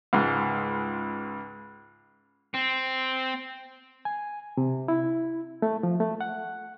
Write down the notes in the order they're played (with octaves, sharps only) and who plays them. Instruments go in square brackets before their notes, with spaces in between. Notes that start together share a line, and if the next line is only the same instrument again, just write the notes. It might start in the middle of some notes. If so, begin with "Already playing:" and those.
[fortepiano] C#2 G#2
[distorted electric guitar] C4
[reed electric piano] G#5
C3
E4
A3
F3
A3
F#5